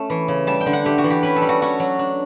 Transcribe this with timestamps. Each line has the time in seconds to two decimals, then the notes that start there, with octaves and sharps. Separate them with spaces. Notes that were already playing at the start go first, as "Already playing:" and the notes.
Already playing: A3 C#4 A5
0.10 E3
0.28 C#3
0.47 G3 A5
0.60 G5
0.66 D3
0.73 F#5
0.85 A3 G4
0.98 F#4
1.04 E3
1.10 G4
1.23 C#4 B4
1.36 A4
1.42 G3
1.49 F#4
1.62 C#4 F#4
1.80 F#3
1.99 D4